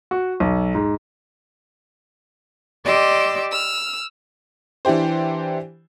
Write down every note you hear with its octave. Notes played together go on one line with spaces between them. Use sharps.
F#4
B1
G#2
G4 D5 D#5 C6 D6 E6
E6 F6
E3 D4 E4 G4 C5